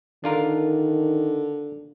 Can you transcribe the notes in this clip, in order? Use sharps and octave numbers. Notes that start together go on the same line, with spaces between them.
D3 D#3 D4 F4 A#4